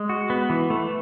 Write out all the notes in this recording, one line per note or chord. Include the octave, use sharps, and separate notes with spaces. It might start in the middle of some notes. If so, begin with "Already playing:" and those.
Already playing: G#3
F#4
B3
E3
A3